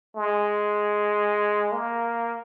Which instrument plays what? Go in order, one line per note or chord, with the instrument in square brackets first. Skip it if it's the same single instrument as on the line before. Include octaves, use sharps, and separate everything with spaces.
[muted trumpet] G#3
A#3